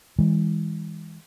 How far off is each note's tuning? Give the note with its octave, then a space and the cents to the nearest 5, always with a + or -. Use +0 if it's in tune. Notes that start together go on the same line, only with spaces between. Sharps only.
E3 -35 G#3 -30